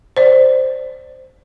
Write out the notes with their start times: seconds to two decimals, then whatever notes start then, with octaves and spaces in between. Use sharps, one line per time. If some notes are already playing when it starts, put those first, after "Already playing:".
0.17 C5 D5